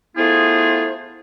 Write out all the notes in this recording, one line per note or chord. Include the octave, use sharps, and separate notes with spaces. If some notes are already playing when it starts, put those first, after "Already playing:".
A3 B3 E4 F4 G#4 C5